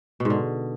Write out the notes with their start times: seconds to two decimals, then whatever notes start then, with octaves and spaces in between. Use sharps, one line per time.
0.20 B2
0.25 G#2
0.30 D3